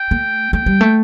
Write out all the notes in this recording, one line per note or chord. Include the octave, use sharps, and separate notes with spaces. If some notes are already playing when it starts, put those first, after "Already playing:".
Already playing: G5
A3
A3 G5
G3
A3